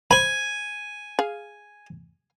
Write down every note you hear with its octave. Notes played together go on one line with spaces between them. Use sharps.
C5 G#5 B5
G#4 F5